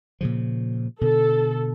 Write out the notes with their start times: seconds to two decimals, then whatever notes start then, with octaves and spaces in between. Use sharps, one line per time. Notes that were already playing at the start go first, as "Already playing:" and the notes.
0.21 A#2 C#3 F3
1.01 B2 D3 A4